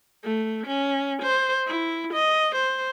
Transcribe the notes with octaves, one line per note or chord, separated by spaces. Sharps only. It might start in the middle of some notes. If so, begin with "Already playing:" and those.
A3
C#4
C5
E4
D#5
C5